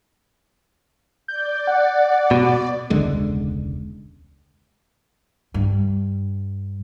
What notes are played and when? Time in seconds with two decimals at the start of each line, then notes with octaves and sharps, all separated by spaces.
1.28 D5 G6
1.67 F#5
2.31 B2
2.90 E1 C#2 D3 G#3
5.54 G2